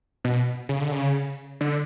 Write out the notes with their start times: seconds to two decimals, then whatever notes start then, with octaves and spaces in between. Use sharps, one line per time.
0.24 B2
0.69 C#3
0.81 D3
0.92 C#3
1.61 D3